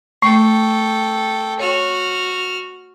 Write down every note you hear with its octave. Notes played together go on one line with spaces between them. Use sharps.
A3 A4 G5 C#6
F#4 C#5 F6